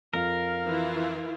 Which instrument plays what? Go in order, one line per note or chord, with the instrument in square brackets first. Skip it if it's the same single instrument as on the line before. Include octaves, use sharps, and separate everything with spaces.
[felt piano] F2 [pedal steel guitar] A#4 [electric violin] F5
[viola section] E3 E4 F4